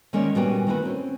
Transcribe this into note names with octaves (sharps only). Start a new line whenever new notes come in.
D#3 G#3 A#3 C#4 C#5 D5
A#2 G3 B3 F#4 G5 G#5
D#3 A3 A#3 E4 F#4 B4
C4 C#4